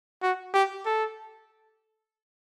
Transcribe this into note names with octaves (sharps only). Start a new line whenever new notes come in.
F#4
G4
A4